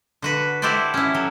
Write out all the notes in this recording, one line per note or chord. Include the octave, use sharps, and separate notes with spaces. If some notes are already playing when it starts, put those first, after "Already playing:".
D3 F#4 B4
E4 F#4 G4 A4 C5 D5
C#4 E4
F#3 A4